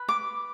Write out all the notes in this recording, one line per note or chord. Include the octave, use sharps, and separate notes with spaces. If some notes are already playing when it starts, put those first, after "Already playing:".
Already playing: B4
D6